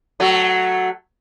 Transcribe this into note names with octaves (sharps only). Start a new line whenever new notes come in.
F#3 A3